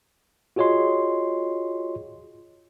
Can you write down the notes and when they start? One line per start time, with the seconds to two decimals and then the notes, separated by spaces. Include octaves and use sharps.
0.56 F4 F#4 G#4 C#5 D#5 C6